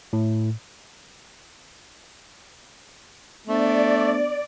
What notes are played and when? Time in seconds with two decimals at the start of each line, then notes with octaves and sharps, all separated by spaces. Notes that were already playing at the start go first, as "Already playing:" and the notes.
0.13 A2
3.47 A3 B3 D4 C5 D5